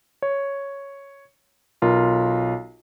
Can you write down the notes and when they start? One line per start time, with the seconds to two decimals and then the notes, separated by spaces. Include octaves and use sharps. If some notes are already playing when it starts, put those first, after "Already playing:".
0.22 C#5
1.82 B1 F4 A#4